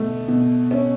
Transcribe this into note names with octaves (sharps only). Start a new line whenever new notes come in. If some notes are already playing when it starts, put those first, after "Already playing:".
Already playing: B2 A3
B2
C#4